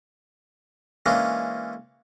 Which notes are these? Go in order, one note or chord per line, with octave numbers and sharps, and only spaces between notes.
E3 G#3 A#3 C#4 D4